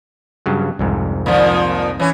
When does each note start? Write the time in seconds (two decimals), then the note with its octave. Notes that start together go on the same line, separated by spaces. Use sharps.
0.46 G2 C#3 F#3
0.79 C2 F2 G#2
1.26 A#2 D#3 F3
2.00 E3 C#4